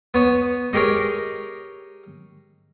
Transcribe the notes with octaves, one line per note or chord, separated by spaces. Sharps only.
B3 C#5 D#6
D#4 G4 G#4 A#4 C#5